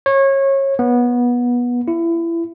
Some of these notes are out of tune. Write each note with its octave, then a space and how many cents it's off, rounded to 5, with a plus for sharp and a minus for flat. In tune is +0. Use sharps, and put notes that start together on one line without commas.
C#5 -25
B3 -20
E4 +25